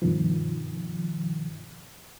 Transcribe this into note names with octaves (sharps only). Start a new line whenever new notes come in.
G2 B2 D#3 F3